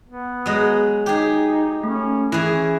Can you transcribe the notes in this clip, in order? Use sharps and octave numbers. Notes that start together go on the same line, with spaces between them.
B3
F#3 G#3 D#6
D#4 G4 G#4
A3 C#4
E3 C#4 E4 G#4